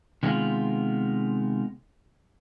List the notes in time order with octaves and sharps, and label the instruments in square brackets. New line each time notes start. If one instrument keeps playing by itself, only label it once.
[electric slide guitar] C3 D#3 G#3 B3 F4